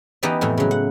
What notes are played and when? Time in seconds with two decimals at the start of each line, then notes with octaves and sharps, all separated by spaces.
0.23 E3 B3 D#4 G4 D5 D#5
0.41 F2 A2 E3
0.57 C#3 F#3
0.71 F#5